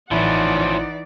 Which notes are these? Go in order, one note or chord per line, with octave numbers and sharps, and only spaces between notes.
A1 E3 F3 C#4 D#4 E4 D5 F#5